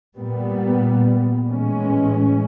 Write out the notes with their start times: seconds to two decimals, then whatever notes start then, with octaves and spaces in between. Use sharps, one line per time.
0.16 A#2 G3 B3
1.47 A2 E3 G#3 C#4